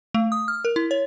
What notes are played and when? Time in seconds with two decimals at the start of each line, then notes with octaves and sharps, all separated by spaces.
0.14 A3
0.32 D#6
0.48 F6
0.65 A#4
0.76 E4
0.91 C#5